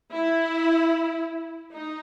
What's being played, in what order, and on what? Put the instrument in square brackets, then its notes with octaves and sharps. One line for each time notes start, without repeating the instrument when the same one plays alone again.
[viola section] E4
D#4